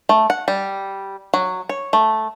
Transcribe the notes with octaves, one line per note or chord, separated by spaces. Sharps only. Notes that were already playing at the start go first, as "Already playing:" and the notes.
A3
F#5
G3
F#3
C#5
A3